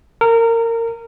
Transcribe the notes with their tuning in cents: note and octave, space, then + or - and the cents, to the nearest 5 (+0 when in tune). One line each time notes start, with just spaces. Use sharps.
A#4 -20